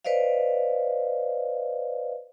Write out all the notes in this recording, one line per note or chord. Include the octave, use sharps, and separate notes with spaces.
B4 C5 D5 D#5 F5